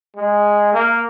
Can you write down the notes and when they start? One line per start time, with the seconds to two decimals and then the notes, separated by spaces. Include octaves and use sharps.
0.16 G#3
0.73 A#3